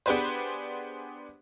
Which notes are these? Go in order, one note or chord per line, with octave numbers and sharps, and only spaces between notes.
B3 D4 G4 G#4 B4 C5